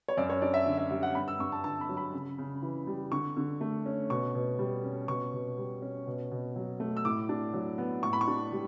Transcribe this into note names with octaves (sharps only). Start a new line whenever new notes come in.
C#5
F#2 D5
C#5
D4 D5
E5
D3
E5
G3 E5
F#5
G2 B5
E6
G2 C#6
A5
D3 A5
B5
F#3
B5
C#3
C#3
E3
G3
D3 C#6
D3
A3
C#4
B2 C#6
B2
G3
C#4
B2 C#6
B2
G3
C#4
B2
B2
F#3
A3
E6
A2 D6
D4
F#3
B3
A2 C#6
B5
C#6
D4
G3